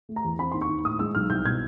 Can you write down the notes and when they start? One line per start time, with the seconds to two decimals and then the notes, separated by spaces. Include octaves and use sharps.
0.09 A3
0.16 A#5
0.24 E2
0.39 C4 B5
0.52 D#2 C6
0.62 C#6
0.69 D#2
0.85 A2 D#6
0.99 G#3 E6
1.15 B1 F6
1.30 C2 G6
1.45 B2 G#6